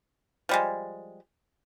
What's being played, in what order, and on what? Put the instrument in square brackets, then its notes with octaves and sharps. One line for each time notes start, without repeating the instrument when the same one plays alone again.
[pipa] F3 G3 G#3